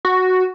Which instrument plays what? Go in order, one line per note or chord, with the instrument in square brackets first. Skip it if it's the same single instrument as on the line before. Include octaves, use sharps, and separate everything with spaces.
[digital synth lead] F#4